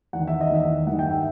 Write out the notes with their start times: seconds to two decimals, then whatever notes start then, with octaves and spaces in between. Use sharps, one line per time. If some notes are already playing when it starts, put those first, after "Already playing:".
0.13 E2 D#3 F#5
0.27 E5
0.41 D#5
0.50 E2 D#3 E5
0.86 G2 D#3 F#5
0.99 G5
1.11 E5